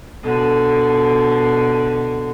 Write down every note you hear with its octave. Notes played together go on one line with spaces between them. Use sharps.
B2 D3